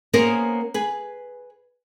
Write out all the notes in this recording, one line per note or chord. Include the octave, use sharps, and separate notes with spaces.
A#3 B3 C#4 G#4 A#4 C5
G#4 B4